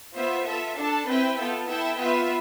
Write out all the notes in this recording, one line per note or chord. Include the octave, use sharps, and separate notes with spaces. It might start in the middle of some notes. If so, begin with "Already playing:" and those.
B3 F4 C5 E5
F4 A4 E5
D4 A4 D5 A5
C4 E4 B4 E5 G5
B3 F4 A4
E4 A4 E5 G5
B3 F4 B4 E5